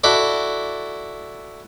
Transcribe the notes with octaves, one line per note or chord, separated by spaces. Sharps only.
E4 F#4 A4 D5